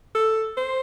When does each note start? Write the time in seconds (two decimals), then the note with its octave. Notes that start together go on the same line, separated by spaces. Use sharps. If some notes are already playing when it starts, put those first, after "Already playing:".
0.15 A4
0.57 C5